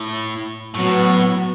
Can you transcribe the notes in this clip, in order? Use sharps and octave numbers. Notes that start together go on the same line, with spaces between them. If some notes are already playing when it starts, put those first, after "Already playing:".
Already playing: A2
A2 F#3 B3 F#4